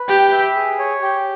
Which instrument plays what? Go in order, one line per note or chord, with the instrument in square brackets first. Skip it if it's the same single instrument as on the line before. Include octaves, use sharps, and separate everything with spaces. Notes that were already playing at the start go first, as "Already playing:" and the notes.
Already playing: [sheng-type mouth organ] B4
[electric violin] G4 [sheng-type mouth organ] G5
[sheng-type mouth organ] E5
G#4
C#5
G4